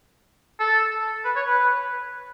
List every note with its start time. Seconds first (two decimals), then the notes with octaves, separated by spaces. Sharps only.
0.60 A4
1.25 B4
1.36 C#5
1.47 B4